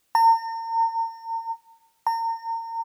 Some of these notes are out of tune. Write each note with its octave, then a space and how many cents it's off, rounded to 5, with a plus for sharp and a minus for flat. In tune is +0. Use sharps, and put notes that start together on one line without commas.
A#5 -40
A#5 -35